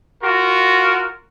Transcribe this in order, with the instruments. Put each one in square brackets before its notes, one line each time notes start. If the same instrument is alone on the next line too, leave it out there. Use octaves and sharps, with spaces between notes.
[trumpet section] F4 F#4 A#4